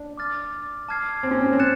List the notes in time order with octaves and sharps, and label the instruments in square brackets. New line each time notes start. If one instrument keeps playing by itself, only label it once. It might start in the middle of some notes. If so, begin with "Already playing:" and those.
Already playing: [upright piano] D4
[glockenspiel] D6 F6 A6
A5 D6 F6 G#6 C7
[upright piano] C4
C#4
C4
C#4
C4
[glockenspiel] F#6 A6 C#7 E7